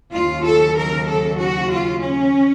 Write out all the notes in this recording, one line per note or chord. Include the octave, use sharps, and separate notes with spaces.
D#2 C#3 F#3 F4
A4
A#4
A4
F#4
F4
C#4